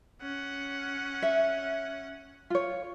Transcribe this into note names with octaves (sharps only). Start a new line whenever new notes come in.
C#4 F#5
E5
F4 C#5